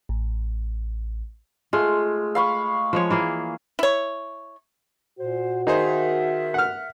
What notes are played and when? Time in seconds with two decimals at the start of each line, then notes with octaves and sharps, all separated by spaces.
0.09 A1
1.73 G#3 A3 F4
2.35 F5 B5 C#6
2.93 F3 G#3 C#5
3.10 E3 A#3 G#4
3.79 E4 C#5
5.19 A#2 F#4 C5
5.67 D#3 D#4 G#4 A#4 C5 E5
6.54 F#5 F6